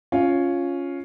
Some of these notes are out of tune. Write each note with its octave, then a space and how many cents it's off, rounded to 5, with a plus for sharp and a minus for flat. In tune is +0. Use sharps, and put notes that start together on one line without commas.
C#4 +0 F4 +0